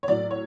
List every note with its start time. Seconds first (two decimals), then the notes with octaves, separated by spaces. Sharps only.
0.03 C#5
0.08 A2 F#3 D5
0.31 C#5